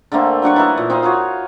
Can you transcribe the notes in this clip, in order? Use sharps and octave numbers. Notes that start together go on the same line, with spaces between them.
D3 A3 A#3 C4
F#3 D4 F#5 C#6
E3 D#4 A4
A#2
C4 D#4 F5 F#5
F4 F#4 C#5